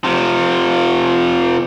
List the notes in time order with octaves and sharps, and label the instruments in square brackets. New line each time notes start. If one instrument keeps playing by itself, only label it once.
[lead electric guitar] C3 F3